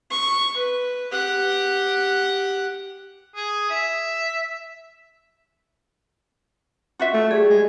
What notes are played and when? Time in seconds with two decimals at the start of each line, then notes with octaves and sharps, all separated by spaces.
0.11 C#6
0.56 B4
1.12 G4 F#5
3.36 G#4
3.70 E5
6.99 F4 F#4 E5
7.14 A3
7.31 G3 G#4
7.50 G#3